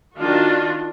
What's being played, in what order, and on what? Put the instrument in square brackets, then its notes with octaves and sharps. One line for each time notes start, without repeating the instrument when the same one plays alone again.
[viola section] D#3 D4 F4 F#4